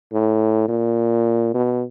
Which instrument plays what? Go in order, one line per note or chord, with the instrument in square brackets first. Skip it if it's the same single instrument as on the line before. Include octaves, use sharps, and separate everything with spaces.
[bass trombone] A2
A#2
B2